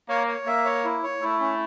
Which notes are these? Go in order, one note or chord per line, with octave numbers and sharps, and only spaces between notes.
A#3 C#5
C#5
A#3 E5
C#5
E4
C#5
A3 E4
C#4